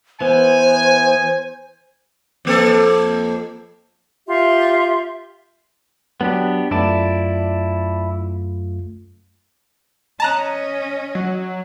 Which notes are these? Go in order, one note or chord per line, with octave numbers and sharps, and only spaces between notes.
E3 B3 C5 G#5
F2 A#3 A4
F4 G4 E5 C6
F#3 B3 D4 G4
F#2 A3 E4 F4 D5 A5
C#4 D#5 A5 A#5 F#6
F#3